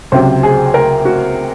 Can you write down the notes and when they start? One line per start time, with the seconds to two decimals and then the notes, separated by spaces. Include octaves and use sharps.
0.12 C#2 C3 F#3 C5
0.43 G#4
0.74 A#4
1.05 F#4